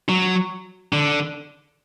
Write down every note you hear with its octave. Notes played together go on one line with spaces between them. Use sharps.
F#3
D3